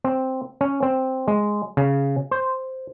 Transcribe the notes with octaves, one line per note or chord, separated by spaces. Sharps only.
C4
C#4
C4
G#3
C#3
C5